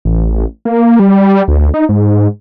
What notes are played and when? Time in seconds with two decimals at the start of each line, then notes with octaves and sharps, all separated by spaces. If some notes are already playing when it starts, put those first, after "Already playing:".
0.05 A1
0.65 A#3
0.99 G3
1.48 D2
1.74 D#4
1.89 G#2